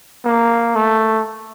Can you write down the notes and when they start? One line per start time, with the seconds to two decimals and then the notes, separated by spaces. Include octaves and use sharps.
0.25 A#3
0.76 A3